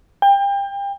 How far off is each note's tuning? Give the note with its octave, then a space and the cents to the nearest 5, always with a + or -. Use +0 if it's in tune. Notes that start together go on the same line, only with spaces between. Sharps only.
G5 +30